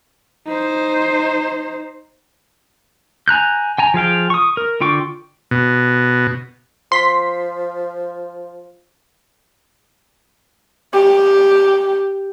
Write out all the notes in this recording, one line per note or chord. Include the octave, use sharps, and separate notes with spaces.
D#4 C5
G#5 A#5 F#6 G6
G5 G#5 A#5
F3 G#4 F5 G5
C#6 D#6
A#4
D3 F4 G5 C#6 D6
B2
F3 C6 B6
G4